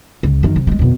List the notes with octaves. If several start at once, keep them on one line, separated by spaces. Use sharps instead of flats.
C#2
F#2 D#3
C3
F#3 G#3
F2 B2